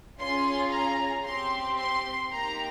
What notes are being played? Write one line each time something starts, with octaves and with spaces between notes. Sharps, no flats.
C#4 F4 G#4 C6
A#5
C4 G4 C6
C6
A#3 D#4 G4 A#5